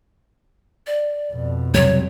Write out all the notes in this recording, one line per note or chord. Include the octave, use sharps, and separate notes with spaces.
D5
F2 B2
C3 F#3 G3 C#5